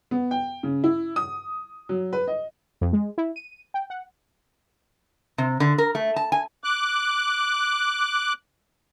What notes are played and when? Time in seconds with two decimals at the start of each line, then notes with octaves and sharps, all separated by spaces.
0.11 B3
0.31 G5
0.63 C#3
0.84 E4
1.16 D#6
1.89 F#3
2.13 B4
2.27 D#5
2.81 F2
2.93 G#3
3.18 E4
3.36 D#7
3.74 G5
3.90 F#5
5.38 C3
5.60 D3
5.78 A#4
5.95 A3
6.16 A5
6.32 G#5
6.64 D6 F#6